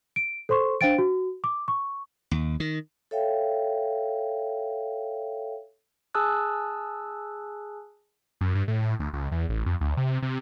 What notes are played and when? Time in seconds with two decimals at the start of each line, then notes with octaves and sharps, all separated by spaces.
0.16 D7
0.49 A4 C5 C6 C#6
0.81 D4 C5 F5 G5 A6 D7
0.98 F#4
1.44 D6
1.68 C#6
2.31 D#2
2.60 D#3
3.11 A4 C#5 E5 F5 G5
6.14 G#4 G#5 A5 D#6 E6 F#6
8.41 F#2
8.55 G2
8.68 A2
8.82 A2
9.00 D2
9.13 C#2
9.32 E2
9.49 A1
9.66 F2
9.81 D2
9.97 C3
10.23 C3